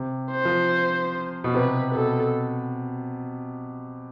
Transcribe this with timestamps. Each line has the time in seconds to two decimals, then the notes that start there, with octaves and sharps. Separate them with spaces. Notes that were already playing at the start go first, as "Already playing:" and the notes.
Already playing: C3
0.32 C5
0.45 F3
1.44 B2
1.54 C3 B4
1.95 B2 A4